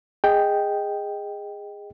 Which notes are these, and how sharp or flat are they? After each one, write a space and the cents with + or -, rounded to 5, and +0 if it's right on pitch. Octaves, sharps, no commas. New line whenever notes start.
G#4 -15 D#5 +0 G5 +0